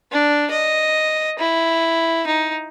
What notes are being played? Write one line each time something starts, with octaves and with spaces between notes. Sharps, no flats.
D4
D#5
E4
D#4